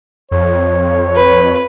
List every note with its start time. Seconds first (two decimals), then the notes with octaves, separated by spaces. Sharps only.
0.31 F2 C#5
1.16 B4